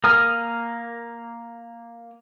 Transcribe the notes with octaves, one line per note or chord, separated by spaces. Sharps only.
A#3 A#4 G#5 D#6 F6